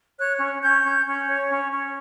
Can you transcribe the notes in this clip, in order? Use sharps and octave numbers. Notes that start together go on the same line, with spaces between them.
C#5 F#6
C#4
C#4 G6
C#4
C#4
C#5
C#4
C#4